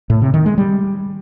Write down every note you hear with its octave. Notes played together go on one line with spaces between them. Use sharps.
A2
C3
D#3
G#3
G3